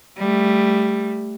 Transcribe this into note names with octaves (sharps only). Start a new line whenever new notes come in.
G3 A3